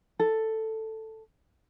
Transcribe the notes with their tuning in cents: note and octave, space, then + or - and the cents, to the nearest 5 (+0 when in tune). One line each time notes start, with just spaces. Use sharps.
A4 +5